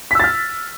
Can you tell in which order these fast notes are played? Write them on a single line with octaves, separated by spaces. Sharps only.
B6 E6 A6 F6